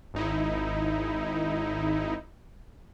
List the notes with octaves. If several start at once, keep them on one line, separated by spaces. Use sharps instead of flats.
G#1 D#4 E4